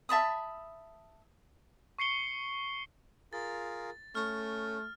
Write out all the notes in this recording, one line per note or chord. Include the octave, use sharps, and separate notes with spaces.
E5 A5 B5 D#6
C#6 C7 C#7 G7
F4 G#4 A#4 A6
A3 C#4 F6